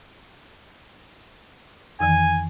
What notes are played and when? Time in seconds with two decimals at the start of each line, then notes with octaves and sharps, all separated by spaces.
2.00 F2 D#3 E3 G#5